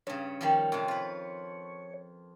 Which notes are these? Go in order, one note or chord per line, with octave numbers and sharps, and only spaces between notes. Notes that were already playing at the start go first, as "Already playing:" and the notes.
G2 C#3 C#5
D#3 F3 G3
F2 C3
F4 B4